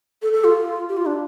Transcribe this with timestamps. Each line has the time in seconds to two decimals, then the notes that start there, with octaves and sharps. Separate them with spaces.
0.22 A4
0.33 A4
0.44 F4
0.89 G4
0.97 F4
1.06 D4